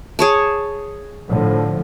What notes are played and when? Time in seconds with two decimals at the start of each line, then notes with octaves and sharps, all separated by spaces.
0.19 G#4 C#5 A5
1.29 A2 D3 F3